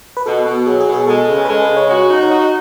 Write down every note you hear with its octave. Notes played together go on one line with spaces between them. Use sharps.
B4
B2 A4
B2
F#3 G#4
G#4
B2
G#4
G#3 A4
C#3
B4
G#3 A4
B4
C#3
C#5
F#4 C#5
D#4
C#5
F#4 D#5